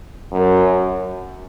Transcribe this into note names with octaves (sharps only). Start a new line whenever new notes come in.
F#2